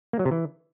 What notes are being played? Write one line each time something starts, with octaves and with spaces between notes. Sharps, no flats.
A#3
F#3
C3
E3